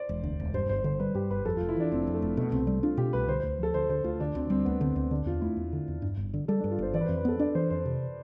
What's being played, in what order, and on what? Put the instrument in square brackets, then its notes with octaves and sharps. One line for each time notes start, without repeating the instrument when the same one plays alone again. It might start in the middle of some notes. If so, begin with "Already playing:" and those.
Already playing: [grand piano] C5 D5
[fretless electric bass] E1
D2
E1
[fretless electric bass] G2 [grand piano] C5
[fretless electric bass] G1 [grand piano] C5
[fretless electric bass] D3 [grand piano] C5
[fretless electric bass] G3 [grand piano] B4
[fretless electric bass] G2 [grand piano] G4
[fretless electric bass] G1 [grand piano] B4
[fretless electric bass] F2 [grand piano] A4
[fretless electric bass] F1 [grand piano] F4
[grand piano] E4
[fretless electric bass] E3 [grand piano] D4
[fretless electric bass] F1 [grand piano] C4
[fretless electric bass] F2
[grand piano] A3
[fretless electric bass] F1
[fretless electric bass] B2 [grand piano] A3
[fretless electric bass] C2 [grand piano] C4
[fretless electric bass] G3
[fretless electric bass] D4 [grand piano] F4
[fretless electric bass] B2 [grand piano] G4
[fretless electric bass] C2 [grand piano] B4
[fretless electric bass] D3 [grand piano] C5
[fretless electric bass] D2 [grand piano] C5
[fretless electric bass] F3 [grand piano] A4
[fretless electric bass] D2 [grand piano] C5
[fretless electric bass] D3 [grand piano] C5
[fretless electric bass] D2 [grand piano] F4
[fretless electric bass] D3 [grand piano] D4
[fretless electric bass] D2 [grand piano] C4
[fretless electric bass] G3 [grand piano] C4
[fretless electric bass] D2 [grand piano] B3
[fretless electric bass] D3 [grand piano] C4
[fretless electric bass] D2 [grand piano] C4
[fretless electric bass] D3 [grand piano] D4
[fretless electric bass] E2 [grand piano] F4
[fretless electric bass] A3 [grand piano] E4
[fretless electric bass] E2
D3
E2
G2
G1
D3
[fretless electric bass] G3 [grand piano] A4
[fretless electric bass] G2 [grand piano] D4
[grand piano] F4
[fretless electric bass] G1 [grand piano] C5
[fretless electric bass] E3 [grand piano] D5
[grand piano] B4
[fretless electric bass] F2 [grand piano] C5
[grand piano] B4
[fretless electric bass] B3 [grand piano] A4
[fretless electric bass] D4 [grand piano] D5
[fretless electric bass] E3 [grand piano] C5
[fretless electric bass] F2 [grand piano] C5
[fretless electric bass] C3